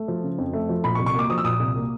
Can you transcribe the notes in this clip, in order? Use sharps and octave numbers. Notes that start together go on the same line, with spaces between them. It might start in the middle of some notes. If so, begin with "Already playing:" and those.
Already playing: A3
F3
C#3
F2
A3
F3
A#2 B5
C#6
C2
C#6
A#3 D6
F3 D#6
E6
A#2 D#6
C2
A#3